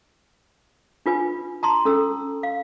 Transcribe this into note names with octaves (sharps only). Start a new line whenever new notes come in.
D4 F4 B4 G#5
A5 A#5 C6
C#4 A4 E6
F5